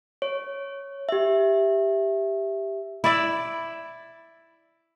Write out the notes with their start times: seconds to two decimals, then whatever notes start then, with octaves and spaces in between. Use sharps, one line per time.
0.22 C#5
1.09 G4 E5
3.04 E4 D5 E5